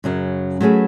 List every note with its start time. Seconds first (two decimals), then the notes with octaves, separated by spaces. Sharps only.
0.04 F#2 C#3 F#3
0.61 F#3 A3 C#4 G#4 B4